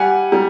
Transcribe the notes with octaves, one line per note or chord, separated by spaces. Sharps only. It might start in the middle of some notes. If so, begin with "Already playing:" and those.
Already playing: G3 F#5 G#5
G3